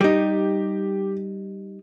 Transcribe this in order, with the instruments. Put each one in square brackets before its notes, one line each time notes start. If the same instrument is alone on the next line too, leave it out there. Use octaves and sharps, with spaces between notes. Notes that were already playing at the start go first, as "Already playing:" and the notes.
[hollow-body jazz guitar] G3 D#4 [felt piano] G4